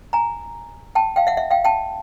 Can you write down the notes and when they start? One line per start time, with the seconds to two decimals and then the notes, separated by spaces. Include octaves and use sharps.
0.13 G#5 A#5
0.95 G5 A5
1.16 F5 G5
1.27 E5 F#5
1.37 E5 F#5
1.51 F5 G5
1.65 G5 A5